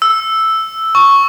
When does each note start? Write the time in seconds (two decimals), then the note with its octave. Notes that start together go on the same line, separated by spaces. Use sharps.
0.02 E6
0.95 C#6